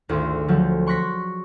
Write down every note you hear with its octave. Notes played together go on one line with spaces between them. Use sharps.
G#1 D2 D3 F4 C6
D3 F3 F#3 F4 A4 C5
C6 C#6 F#6 A#6 B6 C#7